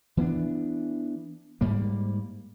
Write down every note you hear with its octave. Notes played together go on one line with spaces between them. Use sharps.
E3 B3 C4 D4
G#2 G3 A#3